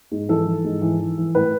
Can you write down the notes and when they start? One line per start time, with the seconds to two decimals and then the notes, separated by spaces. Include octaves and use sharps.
0.11 G#2
0.29 E3 A4
0.47 E3
0.64 G#2
0.82 E3
0.99 E3
1.18 E3
1.35 A2 B4